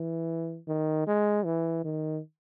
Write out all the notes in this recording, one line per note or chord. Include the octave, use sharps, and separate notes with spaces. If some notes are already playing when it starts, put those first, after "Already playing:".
Already playing: E3
D#3
G#3
E3
D#3